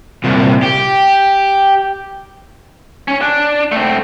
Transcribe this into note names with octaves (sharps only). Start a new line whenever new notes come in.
C2 A#2
G4
C#4
D4
A3 C4